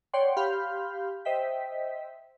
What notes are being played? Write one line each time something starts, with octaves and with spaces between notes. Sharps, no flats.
C#5 D5 F#5 G5 C6
G4 F5 B5 C6 F6 G6
C5 D#5 E5 G5 B6